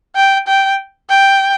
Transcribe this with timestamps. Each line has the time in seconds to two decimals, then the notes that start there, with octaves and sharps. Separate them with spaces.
0.16 G5
0.48 G5
1.10 G5